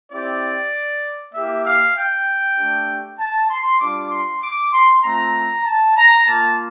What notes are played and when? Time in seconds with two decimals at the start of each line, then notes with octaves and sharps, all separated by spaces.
0.10 C4 E4 G4 D5
1.33 A#3 E4 G4 E5
1.64 F5
1.95 G5
2.57 A3 D4 G4
3.18 A5
3.49 C6
3.80 G3 D4 F4 D6
4.11 C6
4.42 D6
4.72 C6
5.03 A3 C4 F4 A#5
5.64 A5
5.96 A#5
6.26 A#3 F4 A5